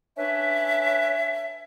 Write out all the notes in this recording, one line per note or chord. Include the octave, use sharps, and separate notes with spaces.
C#4 D4 B4 C#5 E5